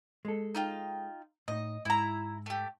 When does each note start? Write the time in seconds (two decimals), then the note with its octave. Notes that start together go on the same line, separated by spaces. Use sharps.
0.25 G#3 A4
0.55 D#4 F4 G5
1.48 A2 D#4 D#5
1.85 G#2 E4 A#5
2.46 A3 G4